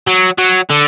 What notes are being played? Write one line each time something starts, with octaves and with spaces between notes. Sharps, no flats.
F#3
F#3
D3